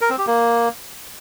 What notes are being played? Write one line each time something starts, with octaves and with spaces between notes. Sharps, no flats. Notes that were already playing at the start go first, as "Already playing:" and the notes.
A#4
C4
G4
A#3